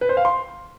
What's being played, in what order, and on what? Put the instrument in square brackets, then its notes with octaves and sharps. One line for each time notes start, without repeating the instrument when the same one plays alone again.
[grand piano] B4
C5
F5
C6